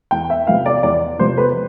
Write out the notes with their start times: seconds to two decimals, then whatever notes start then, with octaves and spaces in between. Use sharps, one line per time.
0.11 E2 G5
0.30 E5
0.47 C3 F3 B3 F5
0.66 D5
0.83 E2 D5
1.19 C3 F3 B3 C5
1.38 B4